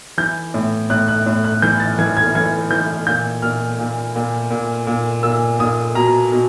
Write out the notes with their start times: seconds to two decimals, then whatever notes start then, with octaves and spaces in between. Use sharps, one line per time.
0.18 E3 G6
0.54 A2
0.90 A2 F#6
1.08 F#6
1.26 A2
1.44 F#6
1.62 E3 G6
1.80 A6
1.99 E3 G#6
2.17 G#6
2.35 E3 G#6
2.71 E3 G6
3.07 A#2 G6
3.42 A#2 F6
3.79 A#2
4.16 A#2
4.51 A#2
4.87 A#2
5.23 A#2 E6
5.59 A#2 D#6
5.95 B2 A#5
6.32 B2